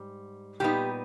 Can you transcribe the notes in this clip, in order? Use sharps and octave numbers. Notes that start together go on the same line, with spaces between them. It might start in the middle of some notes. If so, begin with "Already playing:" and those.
Already playing: G#2 G3
A#2 G3 B3 D#4 G4